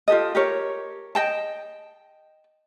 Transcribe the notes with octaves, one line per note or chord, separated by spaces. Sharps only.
F4 G4 A4 D#5
G4 A#4 C#5
D#5 G5 A5